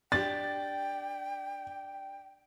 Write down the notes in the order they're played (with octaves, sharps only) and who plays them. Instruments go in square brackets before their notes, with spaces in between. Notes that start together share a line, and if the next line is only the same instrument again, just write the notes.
[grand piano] D4 G4 [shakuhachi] G5 [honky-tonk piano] A6